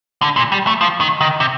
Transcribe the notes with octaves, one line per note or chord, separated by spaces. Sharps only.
D3
A#2
G3
A3
F3
D#3
D#3
C3